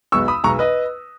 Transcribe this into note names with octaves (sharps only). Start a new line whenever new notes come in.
B1 B2 G#3 B3 C#6 E6
B5 D#6
B1 B2 G#3 B3 A#5 C#6
B4 D#5